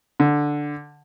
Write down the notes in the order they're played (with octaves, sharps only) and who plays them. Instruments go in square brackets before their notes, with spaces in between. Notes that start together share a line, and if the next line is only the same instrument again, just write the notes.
[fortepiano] D3